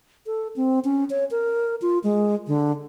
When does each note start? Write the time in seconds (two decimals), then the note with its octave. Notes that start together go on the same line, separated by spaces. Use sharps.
0.26 A4
0.56 C4
0.84 C#4
1.10 C#5
1.31 A#4
1.82 F4
2.04 G#3
2.47 D3